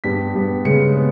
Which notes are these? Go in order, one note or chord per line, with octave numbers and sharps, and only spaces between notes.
G2 G3 B3 B6
G2 G3 B3
C#3 G#3 B3 C#7
B3